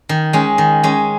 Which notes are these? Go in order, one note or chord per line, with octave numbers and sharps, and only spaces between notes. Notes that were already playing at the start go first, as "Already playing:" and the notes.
D#3
G#3 C#4
D#3
G#3 C#4